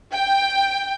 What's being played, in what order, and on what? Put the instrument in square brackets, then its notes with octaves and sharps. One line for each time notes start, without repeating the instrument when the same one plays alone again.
[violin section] G5